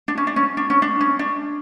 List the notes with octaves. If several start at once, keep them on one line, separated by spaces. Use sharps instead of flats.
D4
C#4
D4
C#4
D4
C#4
D4
C#4
D4